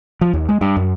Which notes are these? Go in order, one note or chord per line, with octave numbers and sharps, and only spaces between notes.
F3
D#2
G#3
G2
F#2